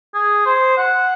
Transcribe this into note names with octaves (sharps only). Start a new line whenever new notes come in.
G#4
C5
F#5